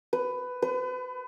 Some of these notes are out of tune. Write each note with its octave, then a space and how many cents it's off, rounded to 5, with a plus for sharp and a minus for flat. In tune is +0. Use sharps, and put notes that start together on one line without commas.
B4 +15
B4 +35